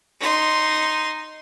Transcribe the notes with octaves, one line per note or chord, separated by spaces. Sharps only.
D#4 C6